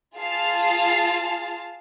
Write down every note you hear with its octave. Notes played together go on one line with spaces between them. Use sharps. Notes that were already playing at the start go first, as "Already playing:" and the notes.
F4 G#4 F5 A5